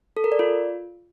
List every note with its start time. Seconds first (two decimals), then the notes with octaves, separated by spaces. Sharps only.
0.17 A4
0.24 A#4
0.32 D5
0.39 F4